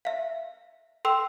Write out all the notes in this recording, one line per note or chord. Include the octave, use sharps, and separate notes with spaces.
E5 F5
A4 G5 C6 E6